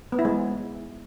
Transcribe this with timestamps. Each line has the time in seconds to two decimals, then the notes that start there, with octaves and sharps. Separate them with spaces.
0.12 B3
0.19 E4
0.25 G#3